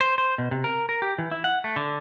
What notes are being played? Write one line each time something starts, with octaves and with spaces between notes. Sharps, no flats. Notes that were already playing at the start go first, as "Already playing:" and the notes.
C5
C5
B2
C3
A#4
A#4
G4
E3
E4
F#5
A3
D3